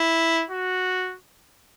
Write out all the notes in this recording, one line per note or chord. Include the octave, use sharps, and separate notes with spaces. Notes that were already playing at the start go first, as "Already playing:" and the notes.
Already playing: E4
F#4